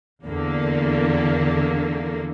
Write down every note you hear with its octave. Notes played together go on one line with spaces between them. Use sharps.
E2 D3 A#3